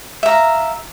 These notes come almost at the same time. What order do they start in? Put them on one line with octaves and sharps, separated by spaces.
E5 A#5 F5